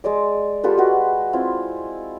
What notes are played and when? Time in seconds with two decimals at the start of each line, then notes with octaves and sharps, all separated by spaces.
0.04 G#3 D5 D6
0.63 F4 G4 A4 B4
0.77 G#3 F#4 B4
1.33 C4 E4 F4